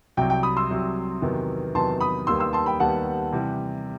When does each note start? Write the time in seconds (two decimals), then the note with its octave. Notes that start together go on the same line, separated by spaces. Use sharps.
0.17 C2 C3 F#3 G5
0.30 G5
0.43 B5 D#6
0.57 C6 E6
0.70 C2 C3 F#3
1.22 E2 C3 D#3 F#3 B3
1.75 E2 C3 D#3 F#3 B3 A5 C6
2.00 B5 D#6
2.27 D#2 D#3 G3 B3 C6 E6
2.40 C6 E6
2.53 A5 C6
2.66 G5 B5
2.80 D#2 D#3 G3 B3 F#5 A5
3.32 C3 E3 G3